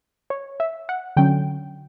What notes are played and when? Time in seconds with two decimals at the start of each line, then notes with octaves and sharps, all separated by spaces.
0.30 C#5
0.60 E5
0.89 F#5
1.17 D3 F#3 C#4 G5